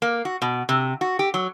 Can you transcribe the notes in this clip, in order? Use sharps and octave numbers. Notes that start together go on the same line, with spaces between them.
A#3
F#4
B2
C3
F#4
G4
F#3